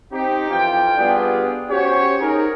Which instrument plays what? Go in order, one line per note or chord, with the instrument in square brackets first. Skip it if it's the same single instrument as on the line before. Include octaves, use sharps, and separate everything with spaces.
[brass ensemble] C4 D#4 G4
F2 E3 F4 G5
G3 B3 D4 F4 G4 G#4
C#4 F#4 G4 C5 C#5
D#4 G#4 A#4